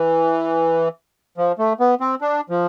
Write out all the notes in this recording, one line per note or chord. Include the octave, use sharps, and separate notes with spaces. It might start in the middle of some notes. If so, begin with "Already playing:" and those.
Already playing: E3
F3
A3
B3
C4
D4
F3